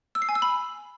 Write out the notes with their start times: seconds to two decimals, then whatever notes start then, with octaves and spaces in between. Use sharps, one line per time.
0.15 E6
0.22 C7
0.29 G#5
0.35 E6
0.42 B5